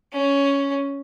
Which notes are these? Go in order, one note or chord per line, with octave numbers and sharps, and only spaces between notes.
C#4